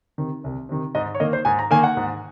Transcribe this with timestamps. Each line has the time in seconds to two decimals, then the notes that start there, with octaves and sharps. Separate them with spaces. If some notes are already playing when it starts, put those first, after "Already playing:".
0.18 C3 D#3
0.44 C2
0.69 C3 D#3
0.95 G#2 D#5
1.15 C#5
1.20 D#3 A#3 D#5
1.33 C5
1.45 G#2 G#5
1.59 A#5
1.71 D#3 A#3 G#5
1.84 F#5
1.97 G#2